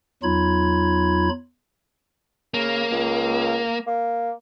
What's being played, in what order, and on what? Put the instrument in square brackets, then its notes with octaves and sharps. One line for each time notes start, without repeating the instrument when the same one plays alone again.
[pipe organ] E2 F#3 D#4 F4 B5 G#6
[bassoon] C#3 [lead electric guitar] A#3
[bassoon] C#2
A#3